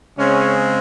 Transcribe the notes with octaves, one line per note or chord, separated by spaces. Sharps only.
C#3 G#3 C4 C#4